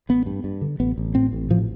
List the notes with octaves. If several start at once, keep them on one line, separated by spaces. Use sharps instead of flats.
A1 B3
G2
G2
D3
A1 B3
A1
A2 C4
A1
A2 F3